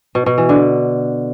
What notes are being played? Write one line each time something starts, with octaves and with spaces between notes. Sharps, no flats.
B2
B2
E3
D3